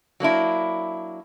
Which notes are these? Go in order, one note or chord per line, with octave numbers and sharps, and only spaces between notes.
F#3 A#3 D4 E4